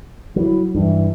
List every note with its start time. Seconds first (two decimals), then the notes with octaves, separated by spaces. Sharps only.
0.36 F#3 E4
0.75 G2 E3